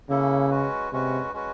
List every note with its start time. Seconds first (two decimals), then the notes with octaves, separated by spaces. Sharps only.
0.09 C#3 A#3 C#4 E4 A4
0.50 G#3 C#4 F#4 B4
0.92 C3 G#3 C#4 F#4 B4
1.33 G#3 C#4 F#4 B4